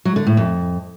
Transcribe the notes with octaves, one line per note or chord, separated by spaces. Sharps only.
F#3
D3
A2
F2